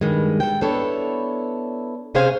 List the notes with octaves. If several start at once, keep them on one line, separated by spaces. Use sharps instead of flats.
G2 D#3 G#3
A4 G5
B3 D4 E4 A4 C#5
C3 C#4 G#4 C5 F5 G#5